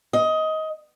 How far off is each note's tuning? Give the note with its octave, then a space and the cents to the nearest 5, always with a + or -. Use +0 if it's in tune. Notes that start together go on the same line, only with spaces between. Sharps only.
D#5 +15